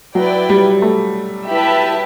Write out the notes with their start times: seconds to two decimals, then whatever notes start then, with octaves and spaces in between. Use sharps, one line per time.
0.15 F#3 E4 B4 D5 G5
0.50 G3
0.82 A3
1.50 E4 G4 B4 E5 A5